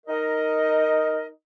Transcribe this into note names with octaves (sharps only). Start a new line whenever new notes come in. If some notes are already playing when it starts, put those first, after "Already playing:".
D#4 A#4 D#5